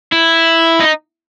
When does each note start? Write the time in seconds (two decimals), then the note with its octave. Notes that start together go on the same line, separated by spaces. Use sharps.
0.12 E4
0.80 D#4